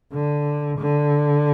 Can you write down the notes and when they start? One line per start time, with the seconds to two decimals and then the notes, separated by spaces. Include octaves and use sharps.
0.13 D3
0.78 D3